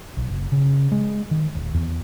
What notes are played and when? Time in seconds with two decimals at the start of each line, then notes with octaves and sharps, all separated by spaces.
0.17 B1
0.28 F#1
0.52 C#3
0.92 G#3
1.31 D#3
1.55 D#1
1.74 E2